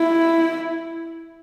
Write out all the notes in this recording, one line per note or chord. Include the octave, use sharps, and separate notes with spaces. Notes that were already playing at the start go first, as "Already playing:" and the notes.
Already playing: E4